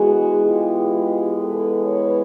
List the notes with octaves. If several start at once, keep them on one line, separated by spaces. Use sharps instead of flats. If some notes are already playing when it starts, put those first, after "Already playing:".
Already playing: E3 G#3 B3 F#4 G#4
F4 G4
A4 B4
B4 C#5